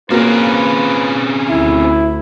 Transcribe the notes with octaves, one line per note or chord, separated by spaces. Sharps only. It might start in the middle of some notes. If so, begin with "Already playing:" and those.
A#3 C4 C#4 F4 F#4 G#4 A#4 B4
D2 E4